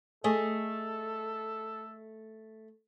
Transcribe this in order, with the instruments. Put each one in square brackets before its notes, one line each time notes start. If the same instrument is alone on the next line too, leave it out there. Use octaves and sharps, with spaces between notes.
[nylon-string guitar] A3 G#4 D#5 [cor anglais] A4